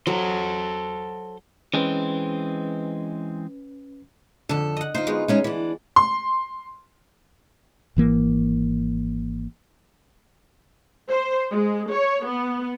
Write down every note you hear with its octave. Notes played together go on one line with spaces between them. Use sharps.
F#3 A4 C5
E3 G#3 C4 C#4 B4
F2 D3 A4
D#5 F#5
D#4 F4 C5
G#3 B3 F#4
G#3 C#4 D#4 G#5
E3 D4
C6
G#1 E3 A#3
C5
G#3
C#5
B3